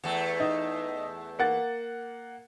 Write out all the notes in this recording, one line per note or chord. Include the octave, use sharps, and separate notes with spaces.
E2 A3
D#4
A#3 F#5 A6